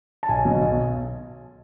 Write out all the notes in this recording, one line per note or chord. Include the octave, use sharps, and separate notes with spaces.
A5
B1 G#5
B2 F#3
B1